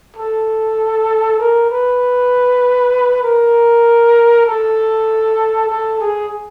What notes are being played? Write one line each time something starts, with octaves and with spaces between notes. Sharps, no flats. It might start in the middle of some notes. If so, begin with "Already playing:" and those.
A4
A#4
B4
A#4
A4
A4
G#4